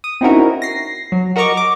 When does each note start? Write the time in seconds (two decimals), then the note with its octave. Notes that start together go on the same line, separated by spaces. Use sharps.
0.04 D#6
0.21 C4 C#4 D#4 E4 F#4 A#4
0.62 A#6 C7
1.12 F#3
1.36 F#4 A#4 D#5 A#5 C#6 D6
1.57 D6